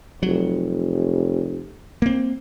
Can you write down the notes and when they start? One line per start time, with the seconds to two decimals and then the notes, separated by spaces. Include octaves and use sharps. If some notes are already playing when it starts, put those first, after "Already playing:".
0.23 F1 F#3
2.02 A#3 C4